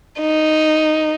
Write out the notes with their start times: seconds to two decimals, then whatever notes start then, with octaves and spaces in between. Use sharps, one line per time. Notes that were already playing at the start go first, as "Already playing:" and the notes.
0.20 D#4